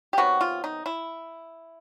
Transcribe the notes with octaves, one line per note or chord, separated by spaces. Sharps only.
G4
C3 D#3 F#3 B3 F#4
F4
D#4
E4